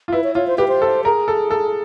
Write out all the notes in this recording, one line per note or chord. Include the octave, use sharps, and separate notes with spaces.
F4
E4 B4
C#5
F4 C#5
C5
G4 B4
C5
A4
G#4 A#4
A4
A4